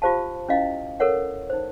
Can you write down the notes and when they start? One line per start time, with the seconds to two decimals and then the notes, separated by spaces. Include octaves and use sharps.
0.02 F4 G4 C5 F5 A5
0.49 C#4 E4 D#5 F5
1.00 A4 A#4 C#5 F#5
1.50 D#4 C5